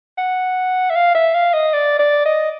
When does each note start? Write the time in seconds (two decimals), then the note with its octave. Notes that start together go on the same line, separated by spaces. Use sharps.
0.18 F#5
0.90 E5
0.96 F5
1.15 E5
1.34 F5
1.54 D#5
1.73 D5
1.99 D5
2.25 D#5